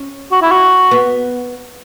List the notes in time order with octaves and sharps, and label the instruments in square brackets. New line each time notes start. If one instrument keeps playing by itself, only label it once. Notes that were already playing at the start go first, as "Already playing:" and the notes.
Already playing: [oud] C#4
[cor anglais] F#4
E4
F#4
[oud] B3